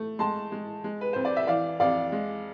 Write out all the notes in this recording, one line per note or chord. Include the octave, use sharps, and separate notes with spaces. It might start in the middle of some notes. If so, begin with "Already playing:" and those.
Already playing: A3
G#3 A5 C6
G#3
G#3
B4
F2 C5
D5
E5
E3 D5 F5
F2 D5 F5
G#3